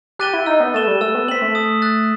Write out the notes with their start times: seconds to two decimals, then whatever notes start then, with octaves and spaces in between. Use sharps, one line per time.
0.19 G4 F#6 A6 D#7 G7
0.34 E4
0.46 D#4 E6
0.60 B3
0.74 A3 A6 E7 G7
0.87 G3
1.01 A3 E6
1.15 B3
1.28 C4 B6 F#7
1.42 A3
1.55 D#6
1.82 F#6 A6